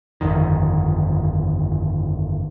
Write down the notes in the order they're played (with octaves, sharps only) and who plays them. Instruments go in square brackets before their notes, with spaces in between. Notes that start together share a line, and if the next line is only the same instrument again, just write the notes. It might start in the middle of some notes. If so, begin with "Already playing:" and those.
[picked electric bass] G1 F2 D#3